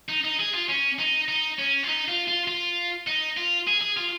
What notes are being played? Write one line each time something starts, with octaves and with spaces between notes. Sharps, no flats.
D#4
D#4
G#4
F4
C#4
D#4
D#4
C#4
F4
D#4
F4
F4
F4
D#4
F4
G#4
G#4
F4